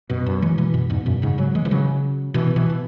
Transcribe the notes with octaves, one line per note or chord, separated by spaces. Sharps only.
F#2 B2
F#2
E3 G#3
B2 E3
F#2 B2
E2 G#2
F#2 B2
G#2 C#3
C#3 F#3
E3 G#3
E3
C#3 F#3
B2 E3
B2 E3
B2